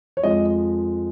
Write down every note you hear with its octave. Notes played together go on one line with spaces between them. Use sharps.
C#5
F2 F3 G#3 D#5